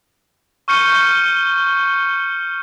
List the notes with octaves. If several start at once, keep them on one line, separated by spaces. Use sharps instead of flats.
C#6 F6 G6 C#7 D#7 G7